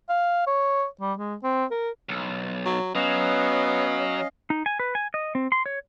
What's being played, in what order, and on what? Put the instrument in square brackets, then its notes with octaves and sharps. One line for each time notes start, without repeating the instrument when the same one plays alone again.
[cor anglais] F5
C#5
G3
G#3
C4
A#4
[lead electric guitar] B1
[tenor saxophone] F#3
[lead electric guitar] F#3 [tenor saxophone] B3 [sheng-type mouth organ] C#4 D#5 F5
[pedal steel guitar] D#4
G#5
B4
G#5
D#5
C4
C6
C#5